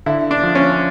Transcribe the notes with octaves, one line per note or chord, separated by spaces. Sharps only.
D3 E4
D4
F3
C#4